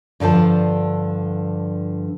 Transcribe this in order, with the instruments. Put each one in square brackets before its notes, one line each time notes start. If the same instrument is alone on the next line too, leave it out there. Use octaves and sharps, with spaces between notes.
[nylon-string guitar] G2 D3 F3 C5 A5